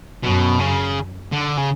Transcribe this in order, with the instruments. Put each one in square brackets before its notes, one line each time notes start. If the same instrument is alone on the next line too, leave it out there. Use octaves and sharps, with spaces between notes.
[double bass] F#2 [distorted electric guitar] B2
[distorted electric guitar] C#3
D3
C#3